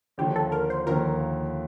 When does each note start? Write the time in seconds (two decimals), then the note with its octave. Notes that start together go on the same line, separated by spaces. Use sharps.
0.18 D#2 D3 F3 G4
0.36 A4
0.52 A#4
0.70 C5
0.86 D#2 D3 F3 A#4